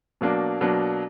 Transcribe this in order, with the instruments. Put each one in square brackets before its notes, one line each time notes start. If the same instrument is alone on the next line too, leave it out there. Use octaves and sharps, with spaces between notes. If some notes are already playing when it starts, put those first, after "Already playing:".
[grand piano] B2 F#3 A#3 D4
B2 F#3 A#3 D4